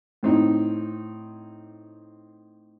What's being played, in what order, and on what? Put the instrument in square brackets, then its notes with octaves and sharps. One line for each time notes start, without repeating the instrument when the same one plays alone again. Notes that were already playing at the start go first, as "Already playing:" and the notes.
[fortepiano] A2 C4 D#4